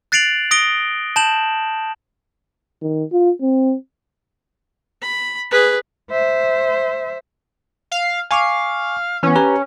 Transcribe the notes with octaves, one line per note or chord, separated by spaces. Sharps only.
F#6 A6 C7 D7 F7 F#7
D#6 A#6 D7 G7
A5 G6 E7 F#7
D#3
F4
C4
B5
G#4 B4
C5 E5
F5
F5 G#5 C#6 D6
E3 B3 C#4
G4 B4 A#5